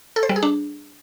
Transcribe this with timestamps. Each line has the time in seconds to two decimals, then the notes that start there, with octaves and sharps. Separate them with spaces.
0.16 A4
0.23 C5
0.29 G3
0.36 G#4
0.43 D4